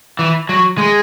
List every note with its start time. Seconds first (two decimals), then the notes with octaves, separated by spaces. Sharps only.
0.19 E3
0.49 F#3
0.78 G#3